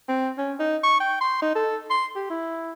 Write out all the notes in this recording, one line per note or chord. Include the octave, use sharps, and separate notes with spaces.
C4
C#4
D#4
C#6
G5
C6
D#4
A4
C6
G4
E4